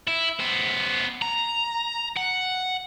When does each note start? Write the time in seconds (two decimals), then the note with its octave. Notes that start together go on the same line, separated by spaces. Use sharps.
0.08 E4
0.40 B3 C5
1.22 A#5
2.17 F#5